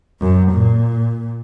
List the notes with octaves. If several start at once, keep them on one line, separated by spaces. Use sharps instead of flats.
F#2
A#2